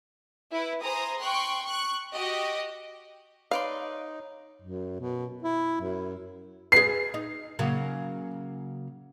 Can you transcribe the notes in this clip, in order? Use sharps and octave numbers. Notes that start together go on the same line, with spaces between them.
E4 B4
G#4 C5 A#5 D#6
G5 C6 C#6 F#6
C#6 F#6
F#4 G4 D#5
D#4 B4 C#5 D5 F5 C6
F#2
B2
E4
F#2
G#4 B4 C7
D#4
C#3 F#3 A#3